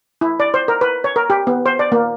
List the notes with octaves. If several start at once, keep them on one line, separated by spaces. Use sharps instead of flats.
E4
D5
C5
A#4
B4
C#5
A#4
G4
B3
C5
D5
A#3